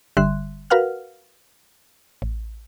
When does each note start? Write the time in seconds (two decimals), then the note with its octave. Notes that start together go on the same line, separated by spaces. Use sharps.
0.17 G1 D3 G3 E5 C6 F#6
0.70 F#4 A#4 B4 F5 F#5 F6
2.22 A1